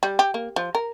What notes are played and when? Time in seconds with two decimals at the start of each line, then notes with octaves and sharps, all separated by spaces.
0.03 G3
0.19 G4
0.34 A#3
0.56 F3
0.75 A#4